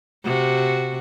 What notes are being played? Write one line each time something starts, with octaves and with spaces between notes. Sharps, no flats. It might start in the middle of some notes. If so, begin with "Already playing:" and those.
C3 F#4